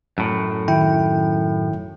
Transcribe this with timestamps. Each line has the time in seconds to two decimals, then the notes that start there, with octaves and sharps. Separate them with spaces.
0.18 F#2 A2
0.68 D#3 E4 G5